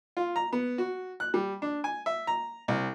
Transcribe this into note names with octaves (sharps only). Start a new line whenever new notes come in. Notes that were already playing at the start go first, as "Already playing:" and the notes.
F4
A#5
B3
F#4
F#6
G3
D4
G#5
E5
A#5
C2